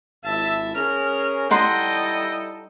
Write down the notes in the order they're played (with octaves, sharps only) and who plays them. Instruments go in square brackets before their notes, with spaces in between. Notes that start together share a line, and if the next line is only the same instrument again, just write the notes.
[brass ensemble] G#1 E4 E5 [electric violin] A5
[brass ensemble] C#4 G#4 A#4 [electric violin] F6
[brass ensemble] G3 E4 A4 [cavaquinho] D#4 F#5 C6 [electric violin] D#5 G5